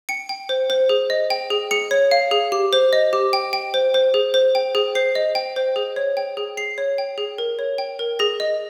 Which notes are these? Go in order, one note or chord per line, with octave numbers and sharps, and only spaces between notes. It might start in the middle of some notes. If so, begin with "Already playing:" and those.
G5 C#7
G5
C5
C5
G#4
D#5
G5
G#4
G#4 C#7
C#5
F5
G#4
G4
C5
D#5
G4
G5
G5
C5
C5
G#4
C5
G5
G#4
C5 C7
D#5
G5
C5
G#4
C#5
G5
G#4
G#4 C7
C#5
G5
G#4
A#4
C#5
G5
A#4
G#4 A#6
D#5